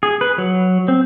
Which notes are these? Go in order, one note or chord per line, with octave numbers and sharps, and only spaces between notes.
G#4
B4
F#3
C4